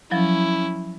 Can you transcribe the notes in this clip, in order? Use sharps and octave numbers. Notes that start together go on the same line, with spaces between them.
F3 F#3 C#4 E4